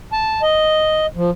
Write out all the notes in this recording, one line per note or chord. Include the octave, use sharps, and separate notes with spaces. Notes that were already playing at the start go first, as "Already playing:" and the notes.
A5
D#5
F3